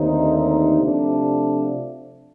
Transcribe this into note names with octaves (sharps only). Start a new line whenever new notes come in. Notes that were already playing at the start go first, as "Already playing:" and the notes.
Already playing: D#2 D3 A3 C4 D#4
C3 F3 A3 D4